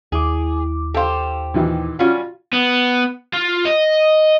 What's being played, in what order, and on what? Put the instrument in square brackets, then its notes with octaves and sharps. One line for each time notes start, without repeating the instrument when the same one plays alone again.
[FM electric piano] D#2 E4 D6 [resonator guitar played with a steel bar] G#4
[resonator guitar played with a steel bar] G4 C5 [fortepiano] A4 F5
[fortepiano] A#2 D#3 E3
[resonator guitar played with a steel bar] G3 C#4 [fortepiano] F4 F#4
[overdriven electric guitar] B3
F4
D#5